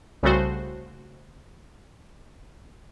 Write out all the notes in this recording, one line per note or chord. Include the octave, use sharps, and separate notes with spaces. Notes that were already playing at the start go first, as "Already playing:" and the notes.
C2 C#3 G3 A3 F#4 C5